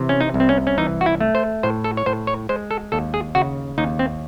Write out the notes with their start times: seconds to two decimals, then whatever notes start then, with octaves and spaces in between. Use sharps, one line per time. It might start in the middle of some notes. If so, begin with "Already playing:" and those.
Already playing: C3 E3
0.09 C#4
0.20 D#4
0.34 C2
0.40 C4
0.49 C#4
0.67 C#4
0.78 E3 D#4
1.01 F#4
1.06 E4
1.20 A3
1.35 C5
1.63 A2 C5
1.84 A4
1.97 C#5
2.06 A2 C5
2.27 C#5
2.49 G#3 C5
2.71 A4
2.92 D#2 A4
3.14 G#4
3.35 C#3 F#4
3.78 D#2 D#4
3.99 C4